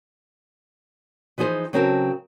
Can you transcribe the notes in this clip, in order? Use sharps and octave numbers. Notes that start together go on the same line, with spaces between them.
E3 F3 D#4 G#4 C5
C#3 F#3 C4 A4 A#4 A5